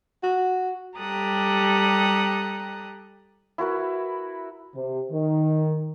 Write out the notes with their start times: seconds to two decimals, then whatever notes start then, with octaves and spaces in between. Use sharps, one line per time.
0.23 F#4
0.98 G3 G4 A4 A#5 D#6 F#6
3.58 E4 F#4 A#4 B4
4.75 C3
5.11 D#3